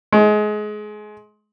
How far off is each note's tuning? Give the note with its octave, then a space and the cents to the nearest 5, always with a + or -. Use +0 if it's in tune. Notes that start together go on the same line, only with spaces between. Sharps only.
G#3 +25